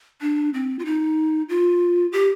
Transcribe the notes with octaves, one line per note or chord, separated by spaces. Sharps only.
D4
C4
F4
D#4
F4
G4